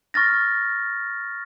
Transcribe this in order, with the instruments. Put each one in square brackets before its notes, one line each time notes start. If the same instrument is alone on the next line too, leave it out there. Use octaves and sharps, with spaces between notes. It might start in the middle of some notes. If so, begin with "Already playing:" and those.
[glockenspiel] C#6 F6 A6 A#6